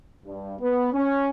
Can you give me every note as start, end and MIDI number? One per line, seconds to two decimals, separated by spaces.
0.25 0.54 43
0.59 0.88 59
0.93 1.30 61